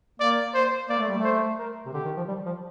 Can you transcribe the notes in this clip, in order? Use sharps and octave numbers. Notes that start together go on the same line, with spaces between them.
A#3 D5
C5
A#3 D5
A3
G3
A3
C5
A#4
C3
D3 G4
D#3
F3
G3
F3